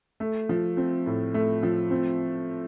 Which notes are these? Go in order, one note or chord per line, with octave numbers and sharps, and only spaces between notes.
A3
F3
C4
A2
A3
F3
C4